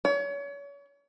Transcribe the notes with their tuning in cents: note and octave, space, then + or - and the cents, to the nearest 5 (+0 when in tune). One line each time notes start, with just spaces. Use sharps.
C#5 +35